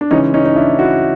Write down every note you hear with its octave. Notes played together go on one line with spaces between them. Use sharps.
D4
C#3 E3 G#3 C#4 D#4
C#4 D#4
D#4
D4 E4
E4 F#4